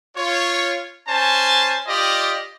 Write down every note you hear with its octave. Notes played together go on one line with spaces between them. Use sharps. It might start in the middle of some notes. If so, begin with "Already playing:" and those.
F4 C#5
C#4 C5 G#5 A5
F4 G4 D5 D#5